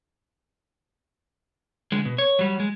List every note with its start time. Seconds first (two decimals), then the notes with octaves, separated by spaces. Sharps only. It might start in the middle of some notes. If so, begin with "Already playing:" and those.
1.92 D3 G#3
2.05 B2
2.18 C#5
2.39 F#3 G3
2.60 G#3